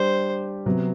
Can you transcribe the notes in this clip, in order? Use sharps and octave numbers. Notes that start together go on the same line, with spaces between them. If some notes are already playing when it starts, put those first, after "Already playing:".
Already playing: G3 D4 G4 C5
C3 F#3 B3